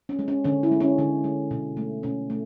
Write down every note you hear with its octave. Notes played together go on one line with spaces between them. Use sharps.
C#4
G#3
C#4
D3 C#4
E4
G#3
C#4
D3
G#3
B2
A3
B2 C#4
A3